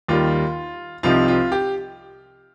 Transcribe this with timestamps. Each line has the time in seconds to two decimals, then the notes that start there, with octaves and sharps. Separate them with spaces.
0.08 D#2 D#3 G3 F4
1.03 C2 C3 F3 C4 D#4 F4
1.28 F4
1.52 G4